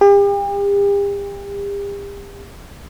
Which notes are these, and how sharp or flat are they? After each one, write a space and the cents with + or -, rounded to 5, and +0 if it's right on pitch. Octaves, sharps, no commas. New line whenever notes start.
G4 +40